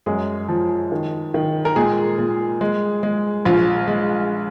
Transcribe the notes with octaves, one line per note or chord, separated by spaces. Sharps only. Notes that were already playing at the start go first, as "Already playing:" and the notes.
F#2 G#3 G#4
F3
D#3
D#3
A#4
A#2 G#3 G#4
A#2
G#3
G#3
A#1 F4
G#3